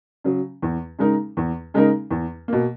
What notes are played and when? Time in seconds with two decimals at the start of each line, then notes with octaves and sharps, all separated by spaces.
0.24 C#3 F#3
0.62 E2
0.99 C#3 G#3 D#4 A#4
1.37 E2
1.74 C#3 G#3 D#4 A#4
2.11 E2
2.48 B2 A#3